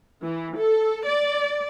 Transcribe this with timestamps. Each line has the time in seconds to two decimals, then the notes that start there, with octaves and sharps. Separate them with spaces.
0.25 E3
0.58 A4
1.06 D5